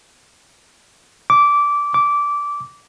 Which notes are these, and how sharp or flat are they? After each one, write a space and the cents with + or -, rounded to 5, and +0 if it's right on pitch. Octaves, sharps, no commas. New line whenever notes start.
D6 -15
D6 -15